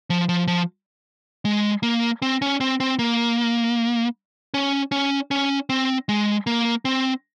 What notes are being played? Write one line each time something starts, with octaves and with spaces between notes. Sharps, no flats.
F3
F3
F3
G#3
A#3
C4
C#4
C4
C4
A#3
C#4
C#4
C#4
C4
G#3
A#3
C4